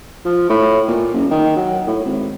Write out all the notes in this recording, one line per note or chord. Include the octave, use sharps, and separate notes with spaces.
F3
A2
A#2
F#1
D#3
F#3
A2
G#1